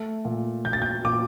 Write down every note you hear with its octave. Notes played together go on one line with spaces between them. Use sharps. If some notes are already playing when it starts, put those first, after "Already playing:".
Already playing: A3
A#2
A#2 G6
A6
G6
A#2 D6